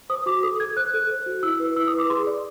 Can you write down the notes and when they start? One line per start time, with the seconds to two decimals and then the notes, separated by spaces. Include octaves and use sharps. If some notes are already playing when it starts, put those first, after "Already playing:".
0.10 C5 D#6
0.26 F#4 D6
0.43 A4 D#6
0.60 A4 G#6
0.77 C5 F#6
0.94 A4
1.10 C5
1.26 F#4
1.43 E4 E6
1.60 B4
1.76 E4 E6
1.87 D#6
1.93 B4
1.99 D6
2.10 G#4 C6
2.27 D5